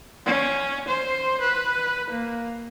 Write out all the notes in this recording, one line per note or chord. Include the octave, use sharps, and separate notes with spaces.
C#4
C5
B4
A#3